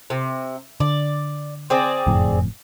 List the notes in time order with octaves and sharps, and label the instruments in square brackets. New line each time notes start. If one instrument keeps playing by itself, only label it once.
[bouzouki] C3
[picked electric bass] D3 [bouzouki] D5
[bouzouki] C4 G#4 D5
[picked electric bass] F#1 F2 A2